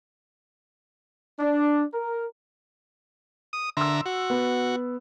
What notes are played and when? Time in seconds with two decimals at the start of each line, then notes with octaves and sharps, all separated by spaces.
1.39 D4
1.94 A#4
3.53 D#6
3.77 D3 E5 A#5 C6 E6
4.06 F#4
4.30 B3